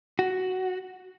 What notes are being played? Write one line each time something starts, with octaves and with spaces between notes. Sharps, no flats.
F#4